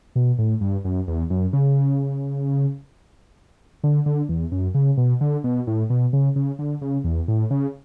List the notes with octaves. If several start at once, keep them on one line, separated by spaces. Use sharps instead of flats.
B2
A2
G2
F#2
E2
F#2
C#3
D3
D3
E2
F#2
C#3
B2
D3
B2
A2
B2
C#3
C#3
D3
C#3
E2
A2
C#3